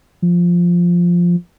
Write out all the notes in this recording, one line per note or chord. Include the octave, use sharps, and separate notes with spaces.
F3